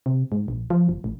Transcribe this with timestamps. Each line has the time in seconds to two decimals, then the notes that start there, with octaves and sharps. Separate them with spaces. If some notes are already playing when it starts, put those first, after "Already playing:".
0.06 C3
0.32 G#2
0.48 A#1
0.70 F3
0.89 F#1
1.04 A1